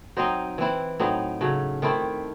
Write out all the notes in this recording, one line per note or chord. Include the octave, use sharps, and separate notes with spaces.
F#3 C4 D#4 C5 D#5
E3 C4 E4
A2 F#3 C4 D#4
C#3 F#3 A3
D#3 A3 C4 E4